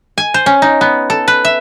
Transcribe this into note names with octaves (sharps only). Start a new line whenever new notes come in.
G#5
C5
C#4
D#4
B3
A4
B4
E5